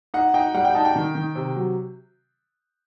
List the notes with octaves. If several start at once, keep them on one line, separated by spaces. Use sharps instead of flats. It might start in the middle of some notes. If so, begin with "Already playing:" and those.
D#4 F#5
D#4 G5
G3 F#5
G5
D#4 A5
G5
D#3
D#3
C3
F#3